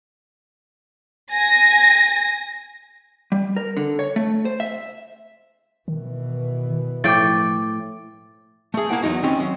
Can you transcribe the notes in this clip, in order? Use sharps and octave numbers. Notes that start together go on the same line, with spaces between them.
G#5 A#6
G3
A#4
D3
C#5
A3
C5
E5
B2 D#3 E3
A2 F3 G5 D6 A6
A3 G#4
A#3 E4 F#5 G5
E2 F#3 D#4 F#4
D#3 C4 C#4 D#5
F#3